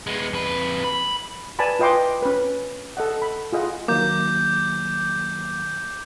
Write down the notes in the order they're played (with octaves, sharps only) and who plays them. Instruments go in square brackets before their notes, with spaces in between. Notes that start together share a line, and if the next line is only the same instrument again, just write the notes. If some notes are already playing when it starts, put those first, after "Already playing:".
[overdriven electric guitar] G#3 B3
F2 B4
B5
[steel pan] B4 D5 G#5 A5 B5
F4 B4 D#5 G5 C6 D6
C#4 B4
A4 D#5 F#5
B5
F4 G#4 D#5 F#5
[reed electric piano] D#3 F#3 A#3 [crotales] D6 G6